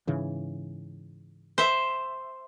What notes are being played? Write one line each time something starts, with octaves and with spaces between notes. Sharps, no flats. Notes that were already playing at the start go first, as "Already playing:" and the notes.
G#2 C#3 E3
C5 E5